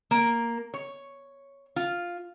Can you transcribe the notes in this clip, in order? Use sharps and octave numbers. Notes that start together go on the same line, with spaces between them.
A#3
C#5
F4